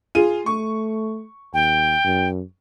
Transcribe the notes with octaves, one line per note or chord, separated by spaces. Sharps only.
F4 G#4 D#7
A3 C#6
D#2 G5
F#2